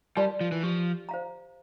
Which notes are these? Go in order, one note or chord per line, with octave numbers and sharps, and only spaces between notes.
G3 A#4 D5 A5 C6
F3
E3
F3 G4
C5 F5 A#5